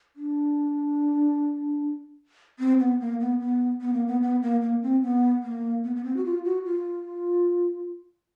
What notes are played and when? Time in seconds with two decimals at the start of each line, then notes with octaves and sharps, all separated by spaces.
0.16 D4
2.59 C4
2.80 B3
3.00 A#3
3.20 B3
3.40 B3
3.81 B3
3.93 A#3
4.07 B3
4.22 B3
4.42 A#3
4.62 A#3
4.83 C4
5.03 B3
5.43 A#3
5.84 B3
5.96 B3
6.04 C4
6.17 F#4
6.25 F4
6.45 F#4
6.65 F4